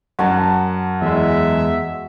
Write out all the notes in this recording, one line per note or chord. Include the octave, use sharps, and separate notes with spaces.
F#2 F#4 F#5 A5
E2 G#3 E5